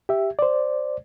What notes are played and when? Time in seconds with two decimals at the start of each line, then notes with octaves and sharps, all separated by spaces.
0.09 G4 E5
0.39 C5 D5